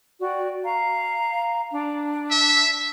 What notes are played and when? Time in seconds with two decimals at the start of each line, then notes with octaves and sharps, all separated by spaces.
0.21 F#4 D5 G5
0.64 F5 A#5
1.71 D4
2.31 E5